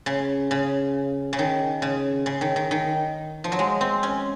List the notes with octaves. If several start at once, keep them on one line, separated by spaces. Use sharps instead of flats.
C#3
C#3
C#3
D#3
C#3
C#3
D#3
D#3
D#3
F3
F#3
G#3
C4
C#4